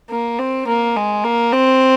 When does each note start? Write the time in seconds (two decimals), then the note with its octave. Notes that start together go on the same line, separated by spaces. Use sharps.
0.10 A#3
0.39 C4
0.68 A#3
0.96 G#3
1.24 A#3
1.53 C4